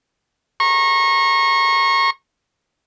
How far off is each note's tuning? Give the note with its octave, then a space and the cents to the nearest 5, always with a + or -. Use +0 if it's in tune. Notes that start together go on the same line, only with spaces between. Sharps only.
A#5 +0 C#6 -30